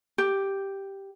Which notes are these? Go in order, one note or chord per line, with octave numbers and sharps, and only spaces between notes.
G4